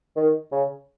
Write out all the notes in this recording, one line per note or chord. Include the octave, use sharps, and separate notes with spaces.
D#3
C#3